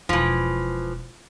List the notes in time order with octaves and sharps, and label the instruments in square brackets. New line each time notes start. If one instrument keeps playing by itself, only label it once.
[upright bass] E1 [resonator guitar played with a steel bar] E3 F3